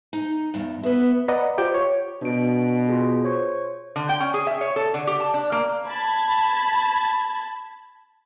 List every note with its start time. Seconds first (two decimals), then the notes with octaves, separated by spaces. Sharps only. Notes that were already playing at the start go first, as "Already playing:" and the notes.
0.13 D#4
0.54 E2 G2
0.83 B3 B4 E5
1.28 B4 D5 D#5 F#5 A#5
1.58 F4 G4 C5 G5
1.74 C#5
2.22 B2 D4 F#4 D7
2.89 F4 G#4
3.24 C5 C#5 C#6
3.96 D3
4.09 G5
4.20 C#4
4.34 G#4
4.47 E5
4.61 C#5
4.76 A4
4.94 D3
5.07 G4
5.20 A5
5.34 D4
5.52 A#3
5.88 A5 B5 G#6